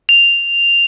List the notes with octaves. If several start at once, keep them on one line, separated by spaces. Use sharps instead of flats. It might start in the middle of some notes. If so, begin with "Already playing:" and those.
F7